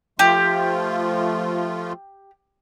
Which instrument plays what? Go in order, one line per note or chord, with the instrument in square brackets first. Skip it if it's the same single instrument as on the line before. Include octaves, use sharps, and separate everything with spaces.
[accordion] F3 A3 F4 [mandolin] G4